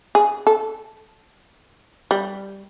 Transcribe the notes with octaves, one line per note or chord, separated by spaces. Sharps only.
G#4
A4
G3